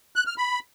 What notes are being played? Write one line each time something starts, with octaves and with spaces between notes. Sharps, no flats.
F#6
F6
B5